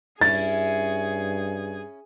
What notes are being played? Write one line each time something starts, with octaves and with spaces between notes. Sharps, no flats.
G2 C#4 E4 G#4 A6